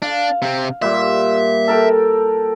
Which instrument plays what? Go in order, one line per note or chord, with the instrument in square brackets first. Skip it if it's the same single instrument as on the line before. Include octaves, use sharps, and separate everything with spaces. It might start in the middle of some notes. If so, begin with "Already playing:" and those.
[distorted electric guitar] D4 [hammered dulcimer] F5
[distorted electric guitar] C3 C4
[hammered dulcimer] A#2 G3 [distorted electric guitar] E5
[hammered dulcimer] A4 A#4 G5